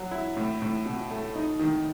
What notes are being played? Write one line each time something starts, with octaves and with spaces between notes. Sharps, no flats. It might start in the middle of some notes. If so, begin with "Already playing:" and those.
Already playing: F#3
E4
A2
A2
B2
A3
D#4
D#3